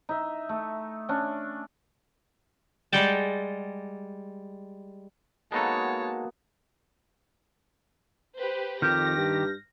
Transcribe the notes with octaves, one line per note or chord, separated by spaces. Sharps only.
D#4 E5
A3
C#4 D4
G3 G#3 F#5 G5 A5
G#3 A#3 B3 D#4 F#4 A4 C#5 A5
G4 B4 C5
F2 D#3 G4 F6 G6 A#6
G2